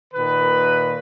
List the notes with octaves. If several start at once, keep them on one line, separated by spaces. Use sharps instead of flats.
A#2 D#3 B4